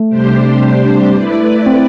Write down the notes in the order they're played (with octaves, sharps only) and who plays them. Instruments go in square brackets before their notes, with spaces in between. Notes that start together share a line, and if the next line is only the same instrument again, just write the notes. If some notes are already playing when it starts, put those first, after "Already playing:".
Already playing: [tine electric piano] A3
[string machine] C3 G3 D4 G4 C5
A3 E4 B4 D5
[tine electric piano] C4